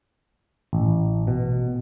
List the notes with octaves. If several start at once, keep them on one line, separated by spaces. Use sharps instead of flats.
A1
B2